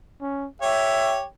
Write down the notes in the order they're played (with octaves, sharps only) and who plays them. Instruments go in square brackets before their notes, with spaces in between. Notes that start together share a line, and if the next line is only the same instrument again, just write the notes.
[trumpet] C#4
[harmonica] G4 C#5 [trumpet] E5